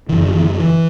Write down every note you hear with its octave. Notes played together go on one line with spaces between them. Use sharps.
F#2 D3 E3
D3
E3
D3
E3